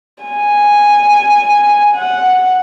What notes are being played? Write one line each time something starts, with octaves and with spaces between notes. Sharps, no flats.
G#5
F#5